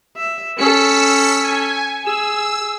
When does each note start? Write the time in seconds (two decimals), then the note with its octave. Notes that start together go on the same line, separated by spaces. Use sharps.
0.17 E5
0.58 C#4 A4 E6 B6 C#7
1.44 G#5
2.06 G#4 E6